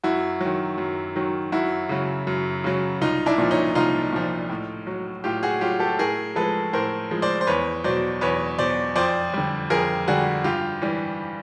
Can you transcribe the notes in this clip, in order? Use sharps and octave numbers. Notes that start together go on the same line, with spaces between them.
F#2 E4 F#4
D#3 F#3
F#2
D#3 F#3
F#2 E4 F#4
C#3 F#3
F#2
C#3 F#3
C2 D#4 F4
D4 E4
A#2 F3
C#4 D#4
C2 D#4 F4
A#2 F3
A2
F#3
A2 F4 G4
F#4 G#4
F#3 F4 G4
G4 A4
A2 G#4 A#4
F3 G#3 A4 B4
A2 A#4 C5
F3 G#3
C5 D5
C5
E2 B4 C#5
B2 F#3 C5 D5
E2 B4 C#5
B2 F#3 C5 D5
F2 C5 D5
D3 G3
F2 G#4 A#4
D3 G3 F#4 G#4
G2 F4 G4
E3 G3